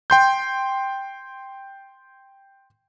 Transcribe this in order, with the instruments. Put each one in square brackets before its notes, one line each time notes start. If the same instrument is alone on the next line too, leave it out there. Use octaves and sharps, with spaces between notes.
[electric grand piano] G5 C6 G6